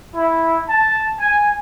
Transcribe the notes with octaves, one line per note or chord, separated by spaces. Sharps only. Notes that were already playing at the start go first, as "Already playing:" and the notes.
E4
A5
G#5